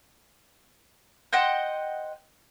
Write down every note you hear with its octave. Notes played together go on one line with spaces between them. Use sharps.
C5 D#5 F#5 G5